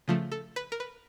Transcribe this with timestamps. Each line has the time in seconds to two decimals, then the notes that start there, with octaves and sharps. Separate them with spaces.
0.08 C#3 F3 A3
0.32 A4
0.56 B4
0.72 A#4
0.80 B4